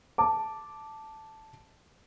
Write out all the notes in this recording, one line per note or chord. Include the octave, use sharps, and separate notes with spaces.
A5 D6